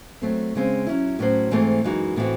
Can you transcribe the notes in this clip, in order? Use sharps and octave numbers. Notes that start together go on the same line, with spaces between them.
F#3 A3 C4
C#3 G#3 C4
F#3 C#4 E4
A2 F#3 C#4 F#4 C5
G#2 E3 A3 C4
F#2 E3 G#3 D#4 F#4
A2 E3 A3 C4 F#4